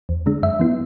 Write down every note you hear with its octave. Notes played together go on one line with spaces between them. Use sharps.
E2
D3 G#3 D4
F#2 E5
E3 B3 E4